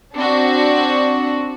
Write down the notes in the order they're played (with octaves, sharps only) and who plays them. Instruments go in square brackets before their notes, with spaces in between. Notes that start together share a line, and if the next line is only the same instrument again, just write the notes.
[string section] C4 D4 F#4